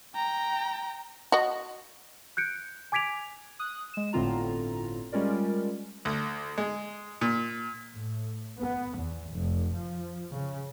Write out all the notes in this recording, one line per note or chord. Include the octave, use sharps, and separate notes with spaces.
G5 A#5
F#4 D#5
F#6 G6 C#7 D7
G#5 D6 G#6 B6 D7 F7
D#6 F#6
G#3 E7
G1 A2 D3 C4 F4 A#5
G3 G#3 C#4 F4 A#4 D5
D2
G#3
A#2
A2
B3
E2
F1
F3
C#3